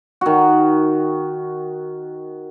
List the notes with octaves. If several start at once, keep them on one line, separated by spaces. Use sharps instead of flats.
D#3 F#4